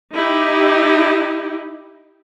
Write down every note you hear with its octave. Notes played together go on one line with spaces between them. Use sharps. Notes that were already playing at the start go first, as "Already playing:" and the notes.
D#4 E4 G4